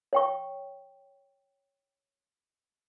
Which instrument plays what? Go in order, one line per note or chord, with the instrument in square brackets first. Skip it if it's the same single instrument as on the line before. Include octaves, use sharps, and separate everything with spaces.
[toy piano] C#5 G5 C#6